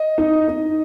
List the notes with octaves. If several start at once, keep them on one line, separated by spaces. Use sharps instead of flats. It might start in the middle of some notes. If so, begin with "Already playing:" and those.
Already playing: D#5
D#4
D#4